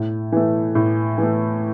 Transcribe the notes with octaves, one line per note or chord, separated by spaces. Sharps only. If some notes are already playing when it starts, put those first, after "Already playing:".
Already playing: A2
E3 A3
A2
E3 A3